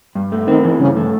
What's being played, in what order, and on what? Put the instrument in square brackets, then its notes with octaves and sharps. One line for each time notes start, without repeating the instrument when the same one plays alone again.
[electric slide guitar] G2
A3
[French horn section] D#3 [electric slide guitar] C4
[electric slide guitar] E3
[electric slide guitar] G2 [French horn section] C#3
[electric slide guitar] A3